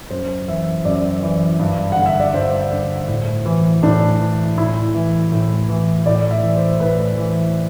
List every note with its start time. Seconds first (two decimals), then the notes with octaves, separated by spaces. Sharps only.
0.10 F#2 C5
0.48 E3 E5
0.85 F#2 D5
1.23 E3
1.59 G2
1.92 F#5
1.97 D3
2.06 E5
2.20 D5
2.34 G2 C5
2.71 D3
3.08 A2
3.46 E3
3.83 A2 D4
4.20 E3
4.57 A2 E4
4.94 E3
5.32 A2
5.69 E3
6.06 A2 D5
6.31 E5
6.43 E3
6.56 C5
6.80 A2 B4
7.17 E3